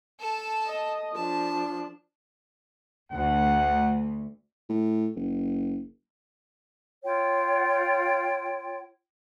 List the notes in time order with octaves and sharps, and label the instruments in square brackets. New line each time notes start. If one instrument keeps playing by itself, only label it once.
[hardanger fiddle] A4 A5
[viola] D#5
[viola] F3 D4 [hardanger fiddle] A5
[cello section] D2 [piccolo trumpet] F#5
[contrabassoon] A2
F#1
[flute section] F4 C#5 G5